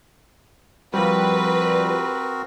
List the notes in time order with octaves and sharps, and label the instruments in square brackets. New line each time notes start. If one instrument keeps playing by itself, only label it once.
[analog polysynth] F3 G3 [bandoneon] C4 F#4 A#4 [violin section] B4